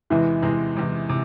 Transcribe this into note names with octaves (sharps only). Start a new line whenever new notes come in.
E2 C3 E3 G#3
E2 C3 G#3
E2 C3 G#3
C3